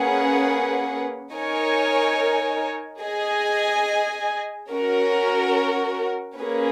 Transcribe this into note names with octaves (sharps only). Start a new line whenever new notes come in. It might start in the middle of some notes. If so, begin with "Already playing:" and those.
Already playing: A#3 C#4 G#4 B4 F#5
D#4 A#4 C#5 G#5
G#4 D#5 G#5
C#4 F#4 A#4
A#3 C#4 G#4 B4